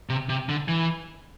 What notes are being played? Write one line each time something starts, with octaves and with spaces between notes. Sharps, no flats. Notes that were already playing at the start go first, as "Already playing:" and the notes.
C3
C3
D3
E3